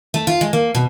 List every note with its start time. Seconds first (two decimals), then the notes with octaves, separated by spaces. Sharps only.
0.14 A3
0.27 F4
0.41 G#3
0.53 A#3
0.75 B2